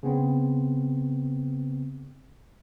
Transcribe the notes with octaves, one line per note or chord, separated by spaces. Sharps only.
C#3 B3 C4